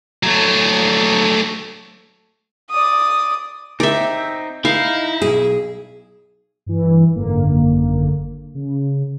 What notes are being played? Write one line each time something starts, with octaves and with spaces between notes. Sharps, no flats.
F#3 A3
D5 D#6
C4 D#4 D5 E5
D#4 E4 F5
B1 G#4
G2 E3
G#1 F#2 D3 A#3
C#3